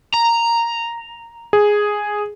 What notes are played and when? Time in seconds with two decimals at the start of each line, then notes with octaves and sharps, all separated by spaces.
0.14 A#5
1.53 G#4